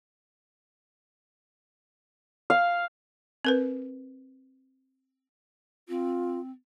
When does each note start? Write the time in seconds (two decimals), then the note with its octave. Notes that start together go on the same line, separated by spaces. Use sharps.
2.50 F5
3.45 C4 A#4 B4
5.89 C4 F4